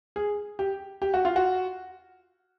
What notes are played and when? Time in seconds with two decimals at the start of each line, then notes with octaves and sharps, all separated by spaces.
0.16 G#4
0.59 G4
1.02 G4
1.14 F#4
1.25 F4
1.36 F#4